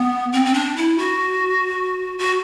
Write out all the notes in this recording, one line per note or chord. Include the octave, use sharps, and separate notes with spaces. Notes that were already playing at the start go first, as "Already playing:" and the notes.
Already playing: B3
C4
C4
D4
E4
F#4
F#4